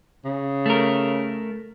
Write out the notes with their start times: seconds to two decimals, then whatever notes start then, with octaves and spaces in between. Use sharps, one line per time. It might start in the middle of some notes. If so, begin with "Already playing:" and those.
0.25 C#3
0.66 A3 A#4